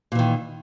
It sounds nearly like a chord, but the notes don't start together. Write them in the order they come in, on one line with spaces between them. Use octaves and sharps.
A#2 E3 D#3